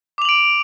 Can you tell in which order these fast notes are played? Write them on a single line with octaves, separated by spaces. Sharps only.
D6 F7 F#7 D7